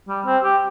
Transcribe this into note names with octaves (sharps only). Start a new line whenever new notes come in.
G3
C4
G4